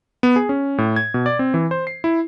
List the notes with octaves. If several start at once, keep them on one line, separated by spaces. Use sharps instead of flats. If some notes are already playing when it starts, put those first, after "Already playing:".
B3
G#4
C#4
A2
G#6
B2
D5
C4
E3
C5
C7
E4